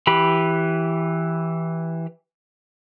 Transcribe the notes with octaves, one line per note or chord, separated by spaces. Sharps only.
E3 G4 B5